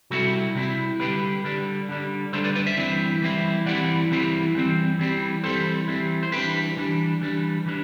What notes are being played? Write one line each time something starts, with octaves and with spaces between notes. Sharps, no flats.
C3 G3 C4 E4 F#4 A4
C3 G3 C4 E4
D3 G3 D4 G4 B4
D3 G3 D4
D3 G3 D4
D3 G3 D4 A4 C5
B4 D5
B4 D5
C5 E5
E3 G3 C4 E4
E3 G3 C4 E4
E3 G3 C4 E4 D5 F#5
E3 G3 C4 E4
E3 G3 C4
E3 G3 C4
E3 G3 C4 A4 C5
E3 G3 C4
C5
E3 G3 D4 G4 B4
E3 G3 D4
E3 G3 D4
E3 G3 D4